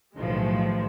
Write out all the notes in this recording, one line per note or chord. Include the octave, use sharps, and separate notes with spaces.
B1 A2 D#3 F3 G#3